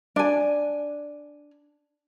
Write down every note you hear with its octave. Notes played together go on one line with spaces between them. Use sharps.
D4 G#5